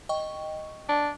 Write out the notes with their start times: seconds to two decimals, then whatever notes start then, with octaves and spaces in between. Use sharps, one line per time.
0.09 D#5 G5 C#6
0.89 D4